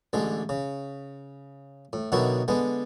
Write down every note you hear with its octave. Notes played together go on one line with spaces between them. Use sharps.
A1 D3 G#3
C#3
A2
B2 D3 D#3 F#3 E4 F#4
D3 G#3 B3